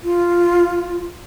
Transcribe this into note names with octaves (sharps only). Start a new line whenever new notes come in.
F4